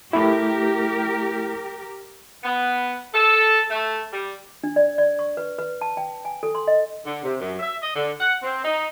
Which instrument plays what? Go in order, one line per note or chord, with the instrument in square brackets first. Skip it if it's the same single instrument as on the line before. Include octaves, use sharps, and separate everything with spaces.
[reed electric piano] A3 E4 [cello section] G4 A#4
[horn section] B3
A4
A3
G3
[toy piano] D4
D5
D5
C#6
B4
B4
A5
G5
G#5
A4
C6
D#5
[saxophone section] D3
C3
F#2
E5
D#5
D3
F#5
C4
D#4